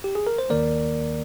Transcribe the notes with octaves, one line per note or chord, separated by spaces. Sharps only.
G4
G#4
A#4
C5
D#2 D#3 A#3 A#4 D5